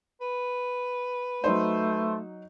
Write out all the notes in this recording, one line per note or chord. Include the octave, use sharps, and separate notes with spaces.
B4
F#3 A3 D#4 C5